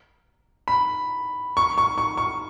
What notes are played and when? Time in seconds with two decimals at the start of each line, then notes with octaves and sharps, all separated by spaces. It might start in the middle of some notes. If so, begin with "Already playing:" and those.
0.68 B5
1.57 C#6
1.78 C#6
1.98 C#6
2.18 C#6